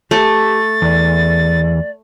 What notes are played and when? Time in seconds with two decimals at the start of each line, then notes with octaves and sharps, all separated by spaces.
0.11 A3 G4 A6
0.82 E2 D5